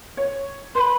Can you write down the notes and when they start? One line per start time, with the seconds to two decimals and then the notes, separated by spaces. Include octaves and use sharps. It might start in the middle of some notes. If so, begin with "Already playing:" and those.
0.17 C#5
0.75 B4 C6
0.80 B5